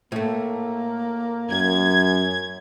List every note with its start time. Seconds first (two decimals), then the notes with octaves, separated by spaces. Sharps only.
0.12 A2 A3 A#3
1.50 F#2 G#6